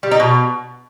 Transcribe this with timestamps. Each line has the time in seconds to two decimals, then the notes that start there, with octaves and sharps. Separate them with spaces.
0.03 G3
0.11 D#4
0.20 B2